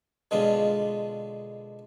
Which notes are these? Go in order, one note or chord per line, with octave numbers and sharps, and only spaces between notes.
B2 D3 G#3 F4